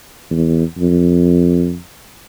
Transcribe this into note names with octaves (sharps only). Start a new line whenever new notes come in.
E2
F2